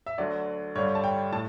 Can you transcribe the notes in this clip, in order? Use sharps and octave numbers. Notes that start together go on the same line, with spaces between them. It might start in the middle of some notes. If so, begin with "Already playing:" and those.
E5
D2 D3 F#3 D5
G2 D3 G3 C#5
A5
G5
A2 A5